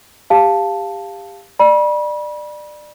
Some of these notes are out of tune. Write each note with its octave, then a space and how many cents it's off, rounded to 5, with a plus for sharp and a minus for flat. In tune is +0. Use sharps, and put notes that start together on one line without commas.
G4 +25 F5 +0 A5 +0
D5 +25 B5 -35